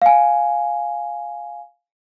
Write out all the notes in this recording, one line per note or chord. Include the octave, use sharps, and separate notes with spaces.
F5 G#5